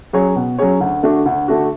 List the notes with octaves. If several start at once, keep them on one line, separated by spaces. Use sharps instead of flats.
F#3 C#4 G#4 C#5
B2
F#3 C#4 G#4 C#5
D2
D3 A3 D4 F#4
D2
D3 A3 D4 F#4